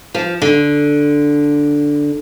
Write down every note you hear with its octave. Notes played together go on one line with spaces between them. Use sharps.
F3
D3